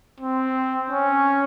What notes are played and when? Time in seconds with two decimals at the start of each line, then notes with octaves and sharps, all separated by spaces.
0.20 C4
0.90 C#4